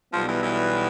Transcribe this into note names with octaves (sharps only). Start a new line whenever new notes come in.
B1 B2 F3 G3 B3
E3
E3